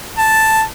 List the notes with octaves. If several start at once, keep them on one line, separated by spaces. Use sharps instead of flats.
A5